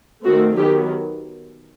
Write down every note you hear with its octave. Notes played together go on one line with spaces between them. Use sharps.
D#3 A3 C4 F#4
D#3 F#3 B3 G4